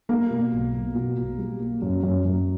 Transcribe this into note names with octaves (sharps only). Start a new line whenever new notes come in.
G3 A#3
B2
B1
B1
B2
B1
G3
A#3
F#2
F#2
F#2